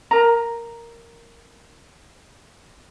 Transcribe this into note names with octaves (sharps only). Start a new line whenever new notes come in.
A#4 A#5